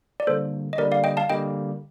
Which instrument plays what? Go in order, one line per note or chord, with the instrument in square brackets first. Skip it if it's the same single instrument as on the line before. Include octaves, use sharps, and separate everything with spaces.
[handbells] D5
[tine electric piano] D3 G3 A#3 [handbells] A4 C5
[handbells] D#5
[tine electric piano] D3 G3 A#3 [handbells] A#4 D5
[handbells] D5 F5
D#5 G5
F5 A5
[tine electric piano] D3 G3 A#3 [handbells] D#5 G5